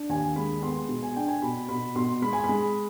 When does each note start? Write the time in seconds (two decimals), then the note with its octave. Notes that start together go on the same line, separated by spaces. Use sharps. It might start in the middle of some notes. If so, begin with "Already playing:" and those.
Already playing: D4
0.09 D#2 G#5
0.36 G#3 B5
0.63 B3 C6
0.89 B2
1.03 G#5
1.16 D4 G5
1.28 G#5
1.42 B2 B5
1.69 B2 B5
1.96 B2 C6
2.22 G#3 B5
2.33 G#5
2.44 B5
2.49 G#3